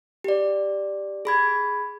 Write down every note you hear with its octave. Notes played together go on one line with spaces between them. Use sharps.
G4 D5
G#4 B5 G#6